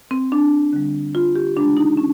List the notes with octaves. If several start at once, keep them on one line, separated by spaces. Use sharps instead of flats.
C4
D4
D3 G3
F4
G4
C#3 E3 G#3 D4
D#4
C#4